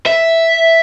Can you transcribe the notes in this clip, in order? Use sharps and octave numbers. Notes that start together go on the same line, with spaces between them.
E5